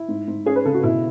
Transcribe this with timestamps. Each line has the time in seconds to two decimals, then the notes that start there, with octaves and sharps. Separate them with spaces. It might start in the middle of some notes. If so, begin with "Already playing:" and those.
Already playing: E4
0.08 G#2
0.28 G#2
0.46 C#4 G#4
0.56 B4
0.65 C#3 A4
0.74 F#4
0.83 B2 E4